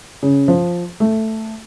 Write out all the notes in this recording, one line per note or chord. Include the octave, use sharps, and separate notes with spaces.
C#3
F3
A3